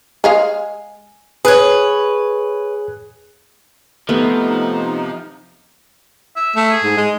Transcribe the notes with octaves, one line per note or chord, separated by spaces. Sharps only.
G#3 G#4 F5
G#4 B4 C#5 F#6 G#6
C3 F3 A3 B3 D#4
E5
A3
G#4
G#2
G#3